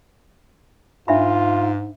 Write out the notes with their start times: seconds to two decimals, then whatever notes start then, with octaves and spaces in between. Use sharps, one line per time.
1.08 G#2 D4 F4 E5 B5